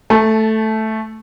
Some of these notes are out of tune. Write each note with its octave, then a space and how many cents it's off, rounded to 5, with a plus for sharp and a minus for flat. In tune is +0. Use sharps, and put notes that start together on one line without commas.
A3 +0 A5 -20